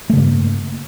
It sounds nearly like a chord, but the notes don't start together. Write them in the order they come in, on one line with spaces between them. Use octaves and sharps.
A3 C#3 G2 A#3